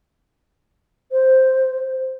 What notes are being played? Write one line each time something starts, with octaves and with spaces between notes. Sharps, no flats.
C5